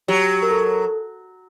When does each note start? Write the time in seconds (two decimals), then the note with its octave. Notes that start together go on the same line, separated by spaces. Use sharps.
0.08 F#3 G4
0.43 A#4
0.51 A4